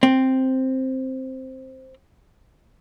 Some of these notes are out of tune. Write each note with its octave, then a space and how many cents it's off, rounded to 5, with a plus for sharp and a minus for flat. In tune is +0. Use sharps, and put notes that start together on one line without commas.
C4 +5